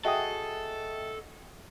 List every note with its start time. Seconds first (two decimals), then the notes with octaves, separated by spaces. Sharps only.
0.05 F#4 G#4 A4 D#5 E5 G5 D#6